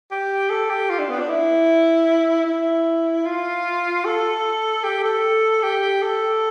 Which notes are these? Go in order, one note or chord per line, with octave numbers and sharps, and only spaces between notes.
G4
A4
G4
F4
D4
B3
D4
E4
E4
F4
A4
G4
A4
G4
A4